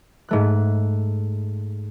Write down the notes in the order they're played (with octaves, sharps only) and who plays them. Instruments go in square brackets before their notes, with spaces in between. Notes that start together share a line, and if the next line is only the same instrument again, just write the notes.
[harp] G#2 A3 F#6